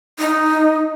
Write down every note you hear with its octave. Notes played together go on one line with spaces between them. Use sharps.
D#4